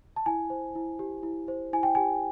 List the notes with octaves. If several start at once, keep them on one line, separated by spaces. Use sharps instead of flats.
A5
E4 G#5
C5
E4
G4
E4
C5
E4 G#5
G5
G4 G#5